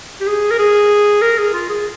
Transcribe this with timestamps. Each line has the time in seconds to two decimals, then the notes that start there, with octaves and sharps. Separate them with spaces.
0.21 G4
0.27 G#4
0.51 A#4
0.59 G#4
1.22 A#4
1.38 G#4
1.53 F4
1.69 G#4